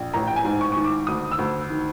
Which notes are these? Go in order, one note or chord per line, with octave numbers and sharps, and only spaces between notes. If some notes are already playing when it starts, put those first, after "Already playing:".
Already playing: A#1
A1 A#5
G5
G#5
G#2
C#6
D#3 C#6
D6
D2 D#6
E6
D2
D#3